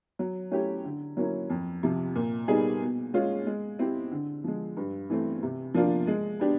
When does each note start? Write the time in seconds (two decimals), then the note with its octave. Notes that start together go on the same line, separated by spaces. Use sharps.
0.19 F#3
0.51 A3 C#4 E4 G4
0.84 D3
1.17 F#3 A#3 C#4 E4
1.50 F2
1.83 C3 F3
2.15 A#2
2.48 G3 B3 D#4 G#4
2.81 B2
3.14 G#3 C#4 F4
3.47 G#3
3.79 C4 E4 G4
4.11 D3
4.44 F3 G#3
4.77 G2
5.10 E3 A3 C4
5.43 C3
5.74 F3 A#3 D4 F4
6.07 G#3
6.40 B3 D4 G4